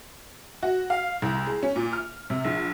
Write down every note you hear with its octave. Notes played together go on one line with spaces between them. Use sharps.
F#4
F5
C2
G#3
C#4
A#2
F6
C3
A#1